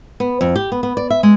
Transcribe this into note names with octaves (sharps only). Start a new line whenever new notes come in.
B3
F2
G4
B3
B3
D5
E5
G#3